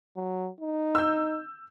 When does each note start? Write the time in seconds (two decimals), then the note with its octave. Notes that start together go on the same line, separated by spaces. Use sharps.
0.16 F#3
0.61 D#4
0.95 E6 G6